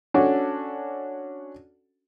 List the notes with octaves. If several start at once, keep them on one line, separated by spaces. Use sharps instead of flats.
C#4 D4 F#4 A4